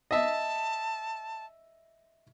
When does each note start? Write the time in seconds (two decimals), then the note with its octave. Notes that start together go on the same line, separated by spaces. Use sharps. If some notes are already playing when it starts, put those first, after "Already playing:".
0.11 D#5 E5 A5